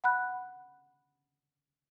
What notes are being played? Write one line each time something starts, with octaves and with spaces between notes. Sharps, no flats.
F#5 B5 F#6